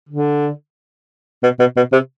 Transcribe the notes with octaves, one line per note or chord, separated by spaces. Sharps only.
D3
B2
B2
B2
C3